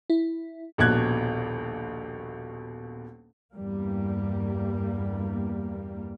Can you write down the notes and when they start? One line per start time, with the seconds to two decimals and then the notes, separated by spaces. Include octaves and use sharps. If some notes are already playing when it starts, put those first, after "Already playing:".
0.10 E4
0.78 D#1 A#1 B2 F#6 G#6
3.54 E2 G2 G3 A#3